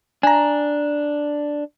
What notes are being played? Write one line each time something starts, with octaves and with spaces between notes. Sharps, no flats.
D4 G#5 A#5